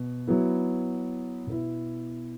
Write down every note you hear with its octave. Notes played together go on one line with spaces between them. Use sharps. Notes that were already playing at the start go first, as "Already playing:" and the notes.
Already playing: B2
F#3 B3 E4
B2 B3 E4